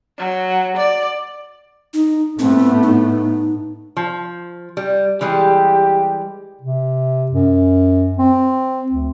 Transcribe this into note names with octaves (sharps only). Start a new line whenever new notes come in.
F#3
D5
D#4
A2 A3 B3 C4
D#4
F3
G3
E3 G3 G#3 G4
C3
F#2
C4
D2